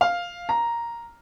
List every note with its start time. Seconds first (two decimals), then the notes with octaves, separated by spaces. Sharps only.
0.01 F5
0.49 A#5